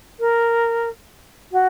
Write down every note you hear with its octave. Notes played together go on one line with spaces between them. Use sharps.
A#4
F#4